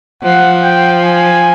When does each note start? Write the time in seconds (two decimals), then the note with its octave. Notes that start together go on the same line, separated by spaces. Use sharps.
0.23 F3 F#5
0.63 G5
1.04 G#5